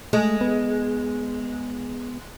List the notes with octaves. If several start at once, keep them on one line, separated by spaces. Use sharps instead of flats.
G#3 A3
B3